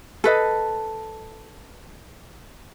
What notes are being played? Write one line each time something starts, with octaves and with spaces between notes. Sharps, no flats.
A4 B4 D#5